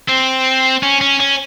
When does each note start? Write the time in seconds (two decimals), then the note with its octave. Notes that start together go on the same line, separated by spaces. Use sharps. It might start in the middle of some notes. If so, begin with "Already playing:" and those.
0.08 C4
0.83 C#4
1.01 C#4
1.20 C#4